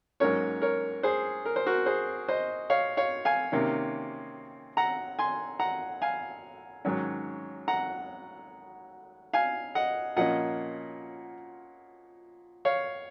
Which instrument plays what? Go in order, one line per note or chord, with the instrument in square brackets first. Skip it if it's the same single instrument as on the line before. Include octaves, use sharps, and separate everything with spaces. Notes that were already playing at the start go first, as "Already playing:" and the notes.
[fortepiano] G#2 F#3 A#3 C#4 A#4 C#5
A#4 C#5
G#4 C5
A#4
C5
F#4 A#4
G#4 C5
C5 D#5
C#5 F5
C#5 F5
F5 G#5
C3 D#3 A#3 C#4
F#5 A#5
G#5 C6
F#5 A#5
F5 G#5
G#2 D#3 F#3 C#4
F#5 A#5
F5 G#5
D#5 F#5
A#2 F3 A#3 C#4 D#5 F#5
C#5 F5